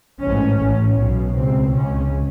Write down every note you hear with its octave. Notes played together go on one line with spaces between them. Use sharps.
A1 G#2 C#4
A1 A2
B1 B2
C#2 B2 C4
C#2 C#3 C#4